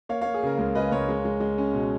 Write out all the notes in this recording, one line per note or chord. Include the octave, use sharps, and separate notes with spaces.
A#3 C#5 F5
A#3 C#5 F5
G#4
C#3 A#4
C#2 A#4
C#3 B4 D#5
C#2 A#4 C#5
G#3
G#3
G#3
C#4
B2